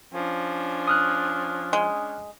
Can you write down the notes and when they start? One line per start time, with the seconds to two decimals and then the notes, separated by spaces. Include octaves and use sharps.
0.13 F3 C#4 D4
0.88 D#6 F6 F#6
1.73 G#3